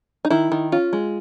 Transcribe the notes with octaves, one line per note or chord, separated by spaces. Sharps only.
D#4
D#3 E4
D#3
C#4 F4
G#3